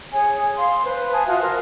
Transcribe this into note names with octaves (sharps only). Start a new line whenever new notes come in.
G#4 C#5 G#5
F5 C6
B4 C5
F5 G#5 A5 D#6
F4 F#4 E5 F5
A#4 C5